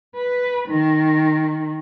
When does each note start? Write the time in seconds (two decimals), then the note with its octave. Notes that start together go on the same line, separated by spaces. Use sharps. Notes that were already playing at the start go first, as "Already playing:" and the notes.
0.16 B4
0.68 D#3